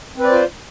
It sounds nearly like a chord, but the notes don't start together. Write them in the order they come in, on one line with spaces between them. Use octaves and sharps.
C4 B4 D5 C5 F4